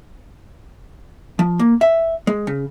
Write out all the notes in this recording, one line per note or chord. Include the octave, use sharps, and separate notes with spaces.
F3
A#3
E5
G#3
C#3